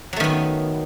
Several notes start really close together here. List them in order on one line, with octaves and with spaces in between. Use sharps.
F#3 A3 D#3 B3